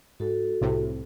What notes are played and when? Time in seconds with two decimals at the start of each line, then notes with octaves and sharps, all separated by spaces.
0.20 G#2 F#4 A4
0.61 C2 A2 C3